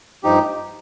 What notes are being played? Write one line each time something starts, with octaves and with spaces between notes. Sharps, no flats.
G2 F3 D#4 G4